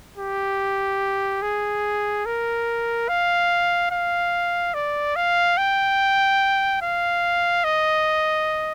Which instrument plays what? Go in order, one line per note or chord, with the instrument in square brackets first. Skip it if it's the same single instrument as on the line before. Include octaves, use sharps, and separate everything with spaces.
[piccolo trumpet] G4
G#4
A#4
F5
F5
D5
F5
G5
F5
D#5